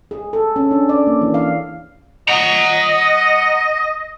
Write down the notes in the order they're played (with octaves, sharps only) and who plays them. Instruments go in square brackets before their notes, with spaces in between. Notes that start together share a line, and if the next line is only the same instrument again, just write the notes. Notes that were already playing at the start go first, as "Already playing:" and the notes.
[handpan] G#4
A4
C#4
D4
D5
A#3
E3
F5
[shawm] D#5 [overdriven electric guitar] F#5 A#5